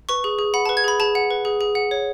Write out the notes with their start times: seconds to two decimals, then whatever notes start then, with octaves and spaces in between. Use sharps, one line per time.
0.09 B4 C#6
0.24 G#4
0.39 G#4
0.54 F#5 B5
0.66 A5
0.69 B4
0.77 G#6
0.84 G#4 B5
1.00 G#4 A5
1.15 F#5
1.31 B4
1.45 G#4
1.61 G#4
1.75 F#5
1.91 C#5